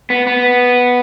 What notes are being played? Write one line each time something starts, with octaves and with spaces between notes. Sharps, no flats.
B3
B3